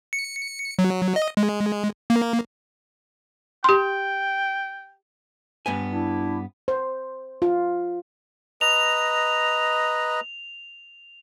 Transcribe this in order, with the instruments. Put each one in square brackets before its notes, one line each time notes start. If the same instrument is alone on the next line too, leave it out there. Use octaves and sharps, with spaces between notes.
[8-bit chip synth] C#7
F#3
D#5
G#3
A#3
[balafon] G4 C6 [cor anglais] G5
[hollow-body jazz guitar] G2 B3 G#5
[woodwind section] D4 E4
[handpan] C5
F4
[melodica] B4 D#5 A#5 [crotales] F7